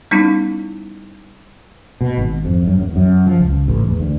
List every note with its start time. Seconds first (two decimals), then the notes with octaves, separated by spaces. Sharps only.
0.11 G3 B3 C#4 D#4 E4
2.01 B2
2.17 G#1
2.45 F2
2.67 F#2
2.81 E2
2.96 F#2
3.26 F3
3.40 C#2
3.68 A1
3.88 E2
4.00 D2